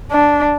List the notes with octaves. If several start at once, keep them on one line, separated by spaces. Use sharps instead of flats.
D4